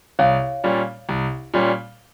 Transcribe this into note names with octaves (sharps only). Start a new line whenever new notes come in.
C2 C#5 F5
A#2 G3 C#4
C2
A#2 G3 C#4